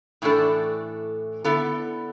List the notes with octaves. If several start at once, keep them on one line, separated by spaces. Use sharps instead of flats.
A2 E3 A3 D4 A4
D3 B3 E4 A4